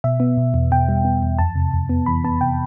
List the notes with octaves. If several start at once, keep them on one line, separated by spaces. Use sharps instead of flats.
B2 E5
B3
B2
E2
B2 G5
G3
B3
E2
F2 A5
C3
F2
B3
E3 B5
B3 A5
C3 G5